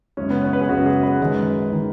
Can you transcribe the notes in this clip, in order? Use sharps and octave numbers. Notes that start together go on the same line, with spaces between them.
F#2 C#3 G#3 C#4
B3
C#4
B4
G#4
F#2 C#3 G#3 F#4
G#4
B4
F#2 D#3 G#3
D#3 G#3